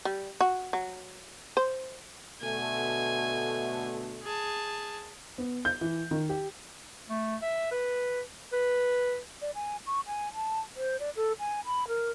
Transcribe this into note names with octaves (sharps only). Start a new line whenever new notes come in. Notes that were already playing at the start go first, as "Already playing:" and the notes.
G3
F#4
F#3
C5
B2 D3 A3 G#5
G#4 A5
B3
G6
E3
D#3
G4
A3
E5
B4
B4
D5
G#5
C#6
G#5
A5
C5
D5
A4
G#5
B5
A#4